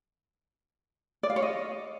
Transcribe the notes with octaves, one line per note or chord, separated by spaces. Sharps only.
D5
F5
C#5
D#5